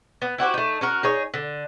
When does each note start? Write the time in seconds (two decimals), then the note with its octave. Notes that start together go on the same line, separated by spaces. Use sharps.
0.22 B3
0.38 E4 F#4 G4 C5
0.54 A3 D#4
0.81 C#4 F#4 A#4
1.03 D#4 G#4 C#5
1.34 D3